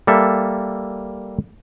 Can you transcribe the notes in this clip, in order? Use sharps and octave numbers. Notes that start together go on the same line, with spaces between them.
G3 A#3 A4 E5